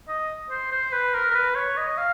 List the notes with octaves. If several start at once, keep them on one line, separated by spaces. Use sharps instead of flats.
D#5
C5
C5
B4
A#4
A#4
B4
C#5
D#5
F5